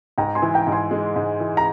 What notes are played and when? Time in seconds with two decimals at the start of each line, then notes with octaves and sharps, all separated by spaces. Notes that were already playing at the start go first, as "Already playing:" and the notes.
0.18 G#2 G5 A#5
0.35 G#5 C6
0.42 E3
0.54 G5 A#5
0.67 G#2
0.72 G#5 C6
0.91 G#3
1.16 G#2
1.40 E3
1.57 A#5